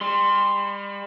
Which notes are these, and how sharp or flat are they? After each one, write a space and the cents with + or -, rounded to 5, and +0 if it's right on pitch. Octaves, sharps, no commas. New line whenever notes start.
G3 +35 C6 +0